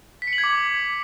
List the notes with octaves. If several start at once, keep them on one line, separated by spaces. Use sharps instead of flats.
B6
C#7
F#7
G#6
D6